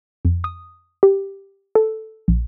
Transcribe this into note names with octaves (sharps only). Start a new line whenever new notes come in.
F2
D#6
G4
A4
A#1